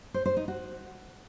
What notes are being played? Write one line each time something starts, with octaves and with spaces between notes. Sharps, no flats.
C5
C5
D#4
F#4